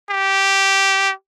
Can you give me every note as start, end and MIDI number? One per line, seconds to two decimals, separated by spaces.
0.10 1.12 67